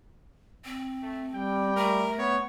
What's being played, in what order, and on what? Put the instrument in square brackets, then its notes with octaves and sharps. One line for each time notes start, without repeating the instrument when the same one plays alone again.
[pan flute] C4
[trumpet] A3
[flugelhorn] G3 [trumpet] G5
[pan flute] A3 [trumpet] A#4
[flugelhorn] B3 [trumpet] C#5